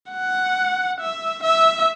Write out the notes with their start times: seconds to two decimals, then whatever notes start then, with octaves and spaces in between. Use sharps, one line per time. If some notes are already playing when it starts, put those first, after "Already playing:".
0.11 F#5
1.00 E5
1.43 E5